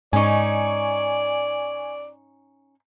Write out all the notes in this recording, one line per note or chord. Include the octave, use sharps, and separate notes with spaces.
G#2 C#4 D#4 D5 G#5 C#6